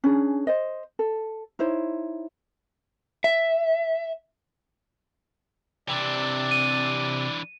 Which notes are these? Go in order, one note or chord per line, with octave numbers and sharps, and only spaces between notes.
C#4 D4 G#4
C5 D#5
A4
D#4 E4 C5 C#5
E5
C3 E3 D4 G4 D5
D#7